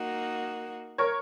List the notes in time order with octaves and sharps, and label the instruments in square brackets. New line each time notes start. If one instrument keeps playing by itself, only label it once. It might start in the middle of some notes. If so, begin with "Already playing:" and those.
Already playing: [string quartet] A#3 D#4 F#4 A#4
[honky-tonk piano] A#4 C#5